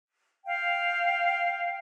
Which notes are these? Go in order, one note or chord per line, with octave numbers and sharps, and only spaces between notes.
F5 G5